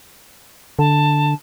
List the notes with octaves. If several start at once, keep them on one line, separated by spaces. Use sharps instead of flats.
D3 A5